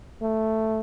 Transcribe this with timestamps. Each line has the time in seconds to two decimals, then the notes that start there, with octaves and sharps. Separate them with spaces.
0.22 A3